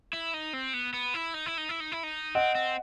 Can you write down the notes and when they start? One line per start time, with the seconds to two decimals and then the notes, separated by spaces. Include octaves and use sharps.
0.13 E4
0.34 D#4
0.53 C4
0.74 B3
0.93 B3
1.14 E4
1.34 D#4
1.46 E4
1.58 D#4
1.69 E4
1.80 D#4
1.92 E4
2.03 D#4
2.35 C4 D#5 F#5
2.55 C4